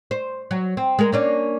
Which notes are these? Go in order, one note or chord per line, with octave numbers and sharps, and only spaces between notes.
C5
F#3
C4
G#3 A#4
A#3 C#4 D4